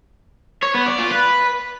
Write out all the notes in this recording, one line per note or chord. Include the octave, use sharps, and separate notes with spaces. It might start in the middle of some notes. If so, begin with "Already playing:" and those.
C#5
B3
D5
F4
B4